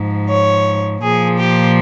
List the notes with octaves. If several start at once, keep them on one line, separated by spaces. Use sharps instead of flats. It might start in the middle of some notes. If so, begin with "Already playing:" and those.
Already playing: G#2 F3
C#5
A#2 F3 G#4
G4